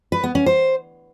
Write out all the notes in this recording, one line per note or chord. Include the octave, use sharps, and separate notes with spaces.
B4
B3
C#4
C5